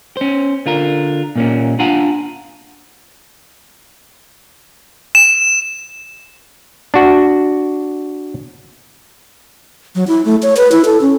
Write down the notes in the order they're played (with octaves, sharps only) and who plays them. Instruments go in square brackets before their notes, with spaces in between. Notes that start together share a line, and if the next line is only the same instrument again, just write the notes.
[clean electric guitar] C#4 C5
D3 F4 A#4
A#2 A#3 C#4
D4 F4 F5 F#5 G#5 A#5
[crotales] E7
[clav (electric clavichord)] D4 F#4
[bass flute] F#3
E4
A3
C#5
B4
E4
A4
C#4